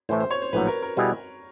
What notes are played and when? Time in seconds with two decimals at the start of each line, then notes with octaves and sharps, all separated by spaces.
0.09 A2 E3 A3 C5
0.20 C5
0.31 C#5
0.42 C5
0.53 A#1 A2 F#3 B4
0.67 A#4
0.82 A#4
0.97 B2 G3 B3 E4 G#4